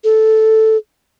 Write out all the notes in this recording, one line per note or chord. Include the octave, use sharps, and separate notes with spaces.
A4